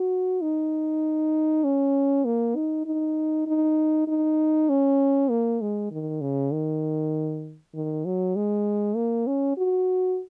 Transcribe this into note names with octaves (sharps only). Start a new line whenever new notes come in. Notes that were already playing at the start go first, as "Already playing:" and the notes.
Already playing: F#4
D#4
C#4
A#3
D#4
D#4
D#4
D#4
C#4
A#3
G#3
D#3
C#3
D#3
D#3
F#3
G#3
A#3
C#4
F#4